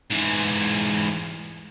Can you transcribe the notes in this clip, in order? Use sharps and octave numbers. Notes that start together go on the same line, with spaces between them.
G#2 E3